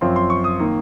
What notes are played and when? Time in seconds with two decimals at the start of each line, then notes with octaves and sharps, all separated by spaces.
0.01 F#2 F3 C4 F4 C6
0.16 C6
0.30 C#6
0.44 D#6
0.59 D#3 A#3